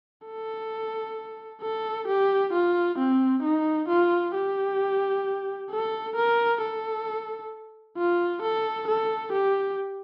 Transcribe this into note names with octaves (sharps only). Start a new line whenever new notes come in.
A4
A4
G4
F4
C4
D#4
F4
G4
A4
A#4
A4
F4
A4
A4
G4